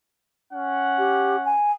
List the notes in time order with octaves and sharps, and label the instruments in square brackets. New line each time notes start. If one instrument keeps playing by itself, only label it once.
[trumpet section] C#4 F#5
[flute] G4
G#5